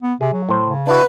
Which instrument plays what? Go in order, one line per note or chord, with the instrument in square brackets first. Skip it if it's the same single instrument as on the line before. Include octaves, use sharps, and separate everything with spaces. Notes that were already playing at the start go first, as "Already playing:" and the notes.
[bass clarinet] B3
[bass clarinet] C3 [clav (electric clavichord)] G#4
[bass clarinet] F#3
[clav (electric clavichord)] A2 C5
[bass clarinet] C#3
[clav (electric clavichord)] D4 E4 F#4 [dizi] B4